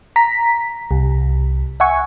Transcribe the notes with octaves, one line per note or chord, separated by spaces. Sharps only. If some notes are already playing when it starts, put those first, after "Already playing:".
A#5 B6
C2
E5 F#5 G#5 C#6